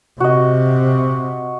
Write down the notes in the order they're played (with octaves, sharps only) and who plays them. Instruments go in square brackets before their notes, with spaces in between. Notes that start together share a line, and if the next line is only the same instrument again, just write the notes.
[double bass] C3 [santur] F#4 D#5